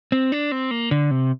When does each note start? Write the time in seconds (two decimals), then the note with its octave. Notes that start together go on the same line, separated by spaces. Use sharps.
0.12 C4
0.32 D4
0.52 C4
0.71 A#3
0.91 D3
1.11 C3